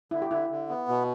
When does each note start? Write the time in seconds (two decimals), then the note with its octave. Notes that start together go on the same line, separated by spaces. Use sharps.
0.11 D3 E4
0.22 G4
0.31 D3 E4
0.50 D3
0.69 B3
0.88 B2